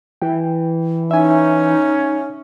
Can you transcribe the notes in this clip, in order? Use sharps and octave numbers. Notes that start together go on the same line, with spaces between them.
E3 G5
C#4 D#4 E5 G#5